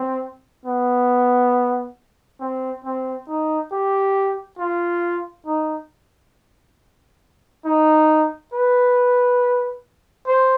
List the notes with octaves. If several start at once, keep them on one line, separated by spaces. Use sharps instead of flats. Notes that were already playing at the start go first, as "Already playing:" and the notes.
Already playing: C4
B3
C4
C4
D#4
G4
F4
D#4
D#4
B4
C5